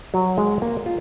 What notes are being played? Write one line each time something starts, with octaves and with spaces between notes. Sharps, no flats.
F#3
G#3
A#3
F4